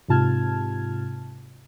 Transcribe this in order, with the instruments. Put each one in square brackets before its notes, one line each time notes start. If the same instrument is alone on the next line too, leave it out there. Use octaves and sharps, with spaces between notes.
[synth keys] G#2 C3 F4 A5 F6 G#6